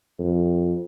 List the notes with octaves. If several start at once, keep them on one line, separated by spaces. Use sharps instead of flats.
F2